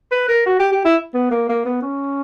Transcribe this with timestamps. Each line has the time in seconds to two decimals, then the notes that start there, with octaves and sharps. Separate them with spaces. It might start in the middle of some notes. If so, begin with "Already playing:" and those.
0.12 B4
0.29 A#4
0.46 F#4
0.60 G4
0.72 G4
0.85 E4
1.14 B3
1.31 A#3
1.49 A#3
1.65 B3
1.82 C#4